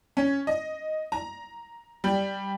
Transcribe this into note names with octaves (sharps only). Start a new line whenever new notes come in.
C#4
D#5
A#5
G3